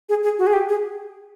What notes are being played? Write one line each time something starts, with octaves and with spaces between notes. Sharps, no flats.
G#4
G#4
F#4
G#4
G4
G#4